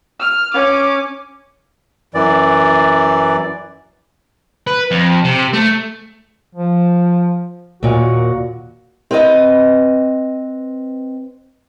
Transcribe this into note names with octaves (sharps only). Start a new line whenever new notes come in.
F6
C#4 D6
F#2 E3 D5
B4
F2
C3
A3
F3
D#2 A#2 F#4
C4 B4 D#5